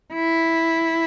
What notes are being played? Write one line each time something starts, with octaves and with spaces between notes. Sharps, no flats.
E4